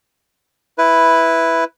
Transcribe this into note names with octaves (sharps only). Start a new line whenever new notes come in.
E4 B4